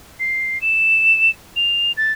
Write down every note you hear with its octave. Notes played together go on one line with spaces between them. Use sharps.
C7
E7
F7
A6